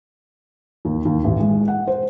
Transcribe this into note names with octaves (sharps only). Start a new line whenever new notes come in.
D#2
D#2
A1
G#3
F#5
C5